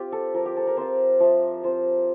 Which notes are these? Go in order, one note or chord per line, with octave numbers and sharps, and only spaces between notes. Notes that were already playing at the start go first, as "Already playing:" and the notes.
Already playing: C4 F4 G4
A4
F3 A#4
G4
A4
A#4
C4 F4 C5
F3 E5
C4 F4 C5